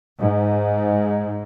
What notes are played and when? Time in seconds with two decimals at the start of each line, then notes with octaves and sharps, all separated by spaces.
0.18 G#2